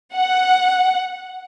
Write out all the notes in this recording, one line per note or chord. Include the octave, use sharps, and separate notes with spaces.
F#5